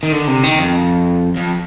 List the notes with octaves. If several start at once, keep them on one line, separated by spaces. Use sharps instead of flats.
D#3
D3
C3
D#3
F2
F2